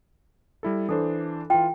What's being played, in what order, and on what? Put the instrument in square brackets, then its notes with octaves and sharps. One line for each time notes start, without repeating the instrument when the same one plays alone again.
[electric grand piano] G3 E4 A4
[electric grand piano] E3 D4 C5 [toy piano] A4
[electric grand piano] E3 F4 [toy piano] G5